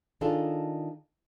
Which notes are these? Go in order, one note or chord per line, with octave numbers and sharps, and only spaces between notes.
D#3 D4 F4 G#4 A4